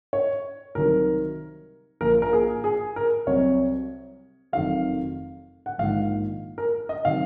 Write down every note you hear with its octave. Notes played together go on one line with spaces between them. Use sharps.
C#5
C2 C3 D#3 F#3 A#4
A#1 A#2 F3 A#4
A#4
G#4
G#4
A#4
C2 C3 F#3 C#5
F1 F2 D#3 F#3 F5
F#5
A#1 G#2 D#3 F5
A#4
D#5
C3 D#3 F#3 F5